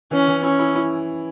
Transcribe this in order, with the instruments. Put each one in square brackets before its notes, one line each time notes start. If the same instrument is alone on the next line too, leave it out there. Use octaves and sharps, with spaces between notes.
[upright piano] E3 [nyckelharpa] C#4
[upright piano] E3
[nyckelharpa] C#4 [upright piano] E4
[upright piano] E4
E4